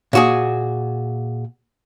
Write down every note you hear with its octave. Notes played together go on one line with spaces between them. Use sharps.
A#2 F#4 G#4